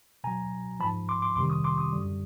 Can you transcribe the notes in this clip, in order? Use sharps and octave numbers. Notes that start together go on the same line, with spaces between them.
B2 F#3 G#5 A#5
G#2 F3 A5 B5
C6 D6
C6 D6
F2 C3 D#3 G3 C6 D6
C#6 D#6
C6 D6
C#6 D#6
F#2 D3 G3